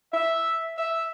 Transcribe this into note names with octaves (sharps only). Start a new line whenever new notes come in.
E5
E5